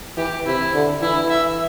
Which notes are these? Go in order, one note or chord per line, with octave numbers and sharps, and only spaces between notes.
E3 G4
C3 E4
D3
E3 E4
E5